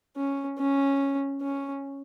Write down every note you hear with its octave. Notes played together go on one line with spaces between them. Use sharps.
C#4
C#4
C#4